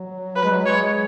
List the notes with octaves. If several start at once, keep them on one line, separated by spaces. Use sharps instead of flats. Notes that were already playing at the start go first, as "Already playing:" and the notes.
Already playing: F#3
F#3 B4
G#3
F#3
G#3 C#5